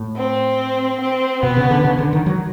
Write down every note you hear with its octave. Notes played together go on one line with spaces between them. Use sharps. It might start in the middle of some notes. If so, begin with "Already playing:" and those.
Already playing: A2
C4
C4
B2 B3
C#3
D3
C#3
D3
D#3
F#3